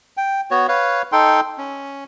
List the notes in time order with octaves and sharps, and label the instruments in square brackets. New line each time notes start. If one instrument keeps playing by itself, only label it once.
[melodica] G5
B3 F#4 C#5
B4 C#5 F5
D#4 A4 G5 C6
C#4